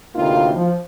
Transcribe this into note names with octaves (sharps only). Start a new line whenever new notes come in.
D2 A2 C3 A#3 D#4 F4
F3